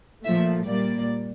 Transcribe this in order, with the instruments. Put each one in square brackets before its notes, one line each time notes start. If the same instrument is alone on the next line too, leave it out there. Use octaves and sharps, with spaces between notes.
[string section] A#2 F3 A3 E5
A#2 G3 A#3 D5